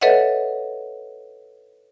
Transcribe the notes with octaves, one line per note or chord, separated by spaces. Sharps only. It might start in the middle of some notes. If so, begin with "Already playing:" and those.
A4 B4 C#5 D#5 E5 F#5